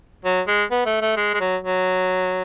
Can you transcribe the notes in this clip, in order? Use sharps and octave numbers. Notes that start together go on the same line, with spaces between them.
F#3
G#3
B3
A3
A3
G#3
G#3
F#3
F#3